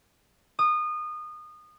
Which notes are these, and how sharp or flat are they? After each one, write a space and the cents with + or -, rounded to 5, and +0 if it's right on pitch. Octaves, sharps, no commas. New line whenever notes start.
D#6 -25